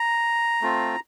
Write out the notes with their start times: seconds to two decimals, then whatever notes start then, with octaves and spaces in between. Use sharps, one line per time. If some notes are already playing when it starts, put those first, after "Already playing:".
Already playing: A#5
0.62 A3 C4 F4